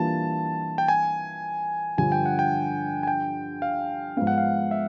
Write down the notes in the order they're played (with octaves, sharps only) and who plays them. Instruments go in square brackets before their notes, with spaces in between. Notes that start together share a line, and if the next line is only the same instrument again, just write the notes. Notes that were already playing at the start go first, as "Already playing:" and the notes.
Already playing: [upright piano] E3 G3 A#3 D4 F4 [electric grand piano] A5
[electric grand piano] G5
G#5
[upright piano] G2 D3 F3 [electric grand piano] G#5
[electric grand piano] G5
F#5
G5
G#5
G5
F5
[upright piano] G#2 F3 G#3 B3 [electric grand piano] F5
[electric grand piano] F#5
F5
E5